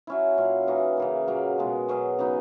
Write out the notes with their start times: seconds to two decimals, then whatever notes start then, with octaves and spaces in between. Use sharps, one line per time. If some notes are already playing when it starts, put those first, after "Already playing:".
0.07 F#3 C#4 E4
0.37 A#2 A#3 C#4
0.67 E3 A#3 D#4 F#4
0.97 C#3 E3 A#3
1.28 A#2 F#3 A#3
1.58 B2 G#3 C#4
1.88 B2 F#3 C#4 G#4
2.19 C#3 F#3 B3 D#4